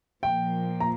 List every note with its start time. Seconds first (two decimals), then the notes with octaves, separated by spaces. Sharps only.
0.23 A#2 F3 A#3 G5
0.80 A#5